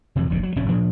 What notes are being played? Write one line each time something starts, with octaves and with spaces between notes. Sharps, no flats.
F2 C3 E3 F#3
F1 A#1 D#2 B2
F#3
F1 A2 F#3 C#4
D2 A#2 F3 D4